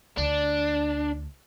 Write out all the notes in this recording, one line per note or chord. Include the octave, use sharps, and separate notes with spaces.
D2 D4